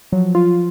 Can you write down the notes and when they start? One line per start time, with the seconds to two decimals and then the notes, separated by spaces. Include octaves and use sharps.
0.12 F3 F#3
0.35 F4